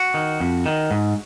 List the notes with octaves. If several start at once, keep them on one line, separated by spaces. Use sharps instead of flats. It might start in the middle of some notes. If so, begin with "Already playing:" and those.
Already playing: F#4
D#3
F2
D#3
G#2